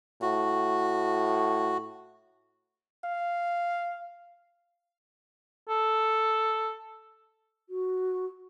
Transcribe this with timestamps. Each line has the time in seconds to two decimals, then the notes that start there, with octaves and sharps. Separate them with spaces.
0.22 A2 F#4
3.04 F5
5.69 A4
7.69 F#4